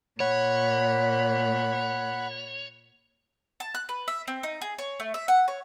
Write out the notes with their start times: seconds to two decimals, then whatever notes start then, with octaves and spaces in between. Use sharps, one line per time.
0.20 A#2 C#5 F#5 B5
3.60 A5
3.75 F#6
3.89 B4
4.08 E5
4.28 C4
4.43 D#4
4.61 G#4
4.79 C#5
5.00 A3
5.14 E5
5.28 F#5
5.48 C#5